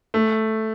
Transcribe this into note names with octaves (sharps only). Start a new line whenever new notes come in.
A3